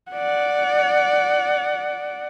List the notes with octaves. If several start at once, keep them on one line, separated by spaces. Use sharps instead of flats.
D5 F#5